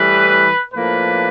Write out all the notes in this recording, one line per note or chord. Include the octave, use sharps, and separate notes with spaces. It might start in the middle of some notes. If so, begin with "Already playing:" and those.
Already playing: A2 E3 G3 B4
A2 F3 A#3 D4 B4